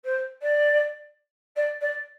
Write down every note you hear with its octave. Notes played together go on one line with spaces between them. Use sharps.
C5
D5
D5
D5